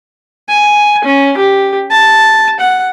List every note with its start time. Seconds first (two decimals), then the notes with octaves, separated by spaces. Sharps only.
0.49 G#5
1.04 C#4
1.37 G4
1.90 A5
2.60 F#5